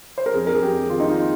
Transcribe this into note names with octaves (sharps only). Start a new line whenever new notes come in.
C5
A#4
F2 G#4
A#4
G#4
F2 G4
D#3 F4
D#4
F4